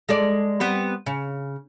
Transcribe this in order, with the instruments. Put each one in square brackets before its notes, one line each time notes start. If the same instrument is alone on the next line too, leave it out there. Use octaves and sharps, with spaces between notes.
[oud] G#3 A4 D5
G3 B3 C4
C#3